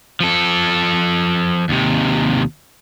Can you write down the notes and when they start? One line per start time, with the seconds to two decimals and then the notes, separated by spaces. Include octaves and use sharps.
0.20 F3 A4
1.69 D#2 C3